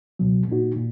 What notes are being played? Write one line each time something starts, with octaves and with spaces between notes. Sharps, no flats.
C#2 B2 F#3
A#2 A#3 D#4 F#4
A#2